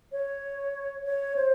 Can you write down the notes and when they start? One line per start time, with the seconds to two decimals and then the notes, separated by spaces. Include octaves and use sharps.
0.12 C#5
1.05 C#5
1.36 C5